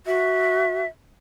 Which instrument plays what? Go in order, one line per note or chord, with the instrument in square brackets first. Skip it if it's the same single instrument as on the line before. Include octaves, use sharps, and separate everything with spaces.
[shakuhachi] F#4 [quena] E5